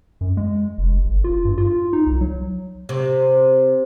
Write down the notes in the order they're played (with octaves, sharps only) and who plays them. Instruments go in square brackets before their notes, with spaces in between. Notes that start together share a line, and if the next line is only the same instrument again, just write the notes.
[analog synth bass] F#2
G#3
F1
G1
F4
G2
F4
D#4
C2
F#3
[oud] C3